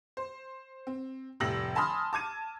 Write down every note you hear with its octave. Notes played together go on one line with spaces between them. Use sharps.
C5
C4
F1 A2 G3 E6 A#6 F#7
G#5 A5 B5 C6 D#6 F6
A5 D6 G#6 D#7